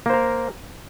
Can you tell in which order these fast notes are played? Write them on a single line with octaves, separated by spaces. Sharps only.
A#3 C5 A#4